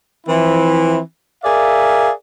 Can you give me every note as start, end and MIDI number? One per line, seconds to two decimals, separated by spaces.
0.27 0.98 52
0.27 0.98 53
0.27 0.98 60
0.27 0.98 64
1.44 2.10 68
1.44 2.10 70
1.44 2.10 74
1.44 2.10 76
1.44 2.10 77